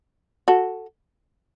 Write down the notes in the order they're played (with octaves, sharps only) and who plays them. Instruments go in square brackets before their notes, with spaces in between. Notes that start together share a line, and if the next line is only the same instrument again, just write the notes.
[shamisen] F#4 A4